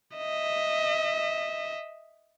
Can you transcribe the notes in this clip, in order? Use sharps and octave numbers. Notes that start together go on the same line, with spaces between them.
D#5 E5